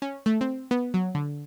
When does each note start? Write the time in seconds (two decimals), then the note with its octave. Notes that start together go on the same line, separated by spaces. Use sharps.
0.02 C#4
0.26 A3
0.41 C4
0.71 B3
0.94 F#3
1.15 D3